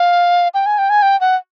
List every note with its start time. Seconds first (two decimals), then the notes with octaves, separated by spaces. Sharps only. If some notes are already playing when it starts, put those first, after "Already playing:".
Already playing: F5
0.54 G5
0.66 G#5
0.78 G5
0.90 G#5
1.02 G5
1.21 F#5